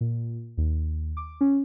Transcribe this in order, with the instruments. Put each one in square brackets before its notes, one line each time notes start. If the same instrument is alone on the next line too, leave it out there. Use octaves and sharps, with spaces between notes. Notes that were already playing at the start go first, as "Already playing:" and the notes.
[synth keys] A#2
D#2
D6
C#4